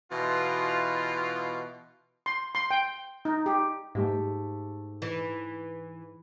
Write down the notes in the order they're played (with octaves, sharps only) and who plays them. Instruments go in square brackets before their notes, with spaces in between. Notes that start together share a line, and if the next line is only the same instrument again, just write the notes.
[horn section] B2 E3 F4
[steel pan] C6
C6
G5
D#4
G4
[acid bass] G#2 [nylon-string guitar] A3 G4 E5
[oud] E3